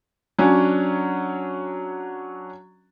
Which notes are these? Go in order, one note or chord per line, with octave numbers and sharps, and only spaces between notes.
F#3 C#4 D4